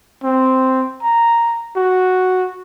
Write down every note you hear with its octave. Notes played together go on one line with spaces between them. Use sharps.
C4
A#5
F#4